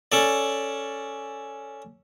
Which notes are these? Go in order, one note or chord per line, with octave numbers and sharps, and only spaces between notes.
C#4 A4 D5